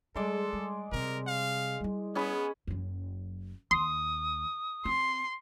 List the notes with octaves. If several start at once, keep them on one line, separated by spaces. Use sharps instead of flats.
G3 G#3 A4 D5 C6
G3
C3 G3 A#4
F5
G3 E4
B3 C#4 G#4 B5
F#1 F#2
D#2 C6 D#6
C4 C6